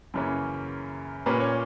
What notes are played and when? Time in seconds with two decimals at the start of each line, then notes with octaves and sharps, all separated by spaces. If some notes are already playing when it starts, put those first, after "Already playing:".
0.14 F#2 C#3 E3 A#3 C#4
1.26 A#2 A#3 C#4 B4
1.40 C#5